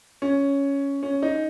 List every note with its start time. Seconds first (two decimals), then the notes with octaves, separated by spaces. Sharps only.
0.22 C#4
1.03 C#4
1.22 D#4